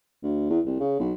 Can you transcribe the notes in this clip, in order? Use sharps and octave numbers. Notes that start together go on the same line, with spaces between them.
D2
E2
C2
C#3
B1